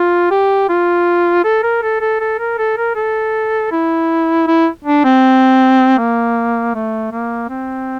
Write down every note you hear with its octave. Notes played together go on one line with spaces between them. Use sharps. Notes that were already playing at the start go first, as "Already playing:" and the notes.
Already playing: F4
G4
F4
A4
A#4
A4
A4
A4
A#4
A4
A#4
A4
E4
E4
D4
C4
A#3
A3
A#3
C4